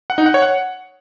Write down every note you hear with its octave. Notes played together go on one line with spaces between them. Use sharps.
F#5
D#4
F#5
C#5
F#5